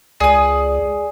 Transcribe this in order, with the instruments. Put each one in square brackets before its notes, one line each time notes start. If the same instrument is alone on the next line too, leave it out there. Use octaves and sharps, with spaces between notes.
[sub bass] C#2 [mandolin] G#4 D#6 [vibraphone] D5